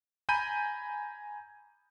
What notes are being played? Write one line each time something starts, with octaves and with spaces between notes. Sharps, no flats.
G#5 A#5 B5 G6 D#7